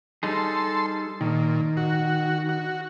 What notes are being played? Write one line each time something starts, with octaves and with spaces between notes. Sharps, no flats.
G3 D#4 G#4 A4 C6
A#2 D#3
F#4
F#4